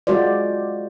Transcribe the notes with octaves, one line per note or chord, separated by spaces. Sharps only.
G#3 F4 F#4 C5 D5